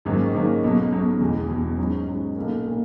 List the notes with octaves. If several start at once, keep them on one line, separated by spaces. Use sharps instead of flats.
G#1 G#2 F#3 A#3 C#4
G#1 G#2 F#3 A#3 C#4
B1 B2 F#3
B1 B2 F#3
E1 E2 B2
E1 E2 B2
G#2 F#3 C#4
G#2 F#3 C#4
B1 A#2 A#3
A#2 A#3